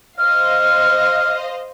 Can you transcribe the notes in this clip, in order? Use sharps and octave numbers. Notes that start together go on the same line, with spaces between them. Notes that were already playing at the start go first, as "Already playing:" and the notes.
C5 D#5 F5 F6